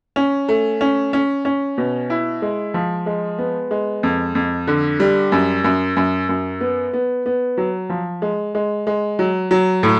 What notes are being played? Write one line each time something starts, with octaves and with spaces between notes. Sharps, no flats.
C#4
A3
C#4
C#4
C#4
B2
E4
G#3
F3
G#3
B3
G#3
F2
F2
D3
G3
F#2
F#2
F#2
F#2
B3
B3
B3
F#3
F3
G#3
G#3
G#3
F#3
F#3
A2